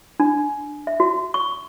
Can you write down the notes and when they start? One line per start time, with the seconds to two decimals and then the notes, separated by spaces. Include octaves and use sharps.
0.20 D4
0.87 E5
1.00 F#4
1.34 C#6